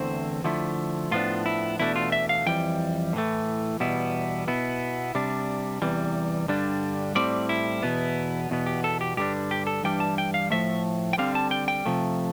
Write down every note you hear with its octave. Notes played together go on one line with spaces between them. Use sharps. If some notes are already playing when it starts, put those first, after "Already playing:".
Already playing: E2 D3 A3 C4 E4 C5
D3 F3 A3 E4
A2 F3 B3 D4 F4
E4
E2 B2 A3 D4 E4
F4
E5
F5
F2 E3 G3 G5
A2 E3 A3
E2 B2 G3 B3 E4
B2 B3 E4
C3 G3 D4
E2 C3 E3 G3
G2 D3 G3 D4
A2 G3 C4 D5
E4
E2 B2 B3
E2 B2 B3
G4
A4
G4
G2 D3 G3 D4 G4
G4
A4
G2 E3 G3 D4 G5
A5
G5
F5
A2 F3 A3 E5
G5
D3 G3 C4 F5
A5
G5
G5
C3 F3 A3